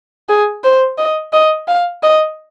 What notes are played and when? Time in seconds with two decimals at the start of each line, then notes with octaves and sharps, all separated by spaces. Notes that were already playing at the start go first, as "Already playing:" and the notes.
0.29 G#4
0.64 C5
0.98 D#5
1.33 D#5
1.68 F5
2.03 D#5